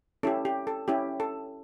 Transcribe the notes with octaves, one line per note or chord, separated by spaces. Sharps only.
C#4 E4 G4 A4
G4
A4
C#4 E4 G4
A4